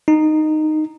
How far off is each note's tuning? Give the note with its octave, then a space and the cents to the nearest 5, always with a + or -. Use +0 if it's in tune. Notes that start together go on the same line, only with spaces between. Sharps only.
D#4 -10